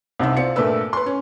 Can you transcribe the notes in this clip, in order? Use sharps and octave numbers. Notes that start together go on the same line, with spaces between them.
C2 C3 D#4 E6
C4 F4 D5 C#7
G2 A#2 A3 D4 B4 E6
B4 C6
C#4